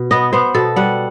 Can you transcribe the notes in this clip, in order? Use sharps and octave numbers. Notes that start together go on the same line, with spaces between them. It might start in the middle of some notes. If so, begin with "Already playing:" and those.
Already playing: B2
B3 D#5
B3 C5
B2 A4
G3 F#5